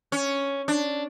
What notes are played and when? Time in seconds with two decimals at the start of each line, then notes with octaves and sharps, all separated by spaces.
0.12 C#4
0.68 D4